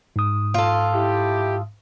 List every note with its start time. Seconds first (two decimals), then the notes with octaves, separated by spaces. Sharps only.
0.16 G#2 D#6
0.54 F4 A4
0.94 E4 G4